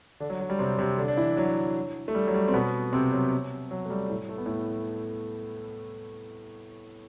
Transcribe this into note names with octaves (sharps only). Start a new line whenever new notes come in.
D3 D4
F#3
F#3
G3
C3 C4
C3 C4
D3 D4
D4
E3 E4
F#3
A3
G3
F#3
G3
C4
B2 B3
C3 C4
F#3
F#3
A3
G3
A2 A3
A3
B3
A2 A3